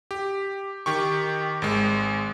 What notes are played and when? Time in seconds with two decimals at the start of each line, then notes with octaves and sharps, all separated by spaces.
0.11 G4
0.86 D#3 G4 C#6
1.62 G#1 G#3